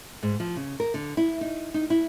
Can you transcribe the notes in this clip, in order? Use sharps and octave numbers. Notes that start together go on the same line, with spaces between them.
G#2
F3
C#3
A#4
D3
E4
D#4
D#4
E4